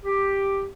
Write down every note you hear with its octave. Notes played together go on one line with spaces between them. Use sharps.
G4